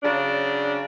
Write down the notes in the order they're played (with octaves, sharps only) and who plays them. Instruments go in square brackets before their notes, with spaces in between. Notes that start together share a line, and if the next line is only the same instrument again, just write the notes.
[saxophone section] C#3 F#3 D4